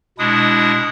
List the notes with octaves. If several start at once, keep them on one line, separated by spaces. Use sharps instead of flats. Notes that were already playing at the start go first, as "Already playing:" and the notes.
B2 G#3 D4 E4 D#6